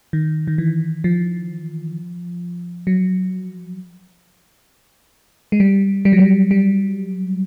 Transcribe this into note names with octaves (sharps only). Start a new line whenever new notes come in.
D#3
D#3
E3
F3
F#3
G#3
G3
G3
F#3
G3
G3